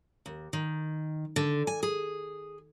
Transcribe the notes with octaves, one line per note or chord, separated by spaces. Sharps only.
D#2
D#3
D3
G#5
G#4